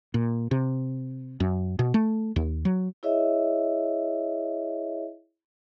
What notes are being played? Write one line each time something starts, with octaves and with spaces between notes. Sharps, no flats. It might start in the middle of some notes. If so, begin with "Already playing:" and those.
A#2
C3
F#2
B2
A3
D#2
F#3
E4 G#4 C#5 D#5 E5